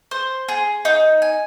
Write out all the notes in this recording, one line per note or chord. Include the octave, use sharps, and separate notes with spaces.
C5
G#4
D#4
G#5